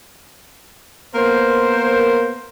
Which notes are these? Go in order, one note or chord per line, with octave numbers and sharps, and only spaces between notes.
A#3 B3 A#4 C5